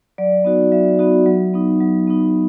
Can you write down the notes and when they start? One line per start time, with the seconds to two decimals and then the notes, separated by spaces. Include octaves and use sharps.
0.18 F#3 D5
0.44 B3 D#4 F#4
0.72 F#3 E5
0.99 B3 D#4 F#4
1.26 F#3
1.54 B3 D#4
1.81 F#3
2.07 B3 D#4